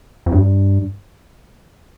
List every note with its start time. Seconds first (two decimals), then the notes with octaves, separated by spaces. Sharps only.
0.26 F2
0.32 G2